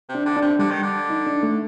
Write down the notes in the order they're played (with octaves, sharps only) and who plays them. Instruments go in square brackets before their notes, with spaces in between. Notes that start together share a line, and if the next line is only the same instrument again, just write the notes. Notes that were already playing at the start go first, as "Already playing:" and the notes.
[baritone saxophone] C3
[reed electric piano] D4
[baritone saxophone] D3
[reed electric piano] D4
[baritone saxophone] C3
[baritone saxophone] D3 [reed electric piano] G3
[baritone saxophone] D#3
D3
[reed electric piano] D#4
D4
A3